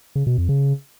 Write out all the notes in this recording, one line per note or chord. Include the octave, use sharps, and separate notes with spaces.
C#3
B2
F2
C#3